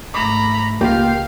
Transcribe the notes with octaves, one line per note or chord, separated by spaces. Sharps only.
G#2 A3 A#5 B5 D6
C#2 A#3 F4 G4 F5